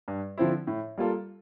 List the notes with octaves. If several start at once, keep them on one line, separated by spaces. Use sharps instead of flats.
G2
D3 F3 C4 E4
A2
G3 A#3 F4 A4